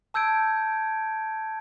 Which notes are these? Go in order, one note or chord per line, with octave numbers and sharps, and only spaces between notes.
A5 E6 G6 G#6 D7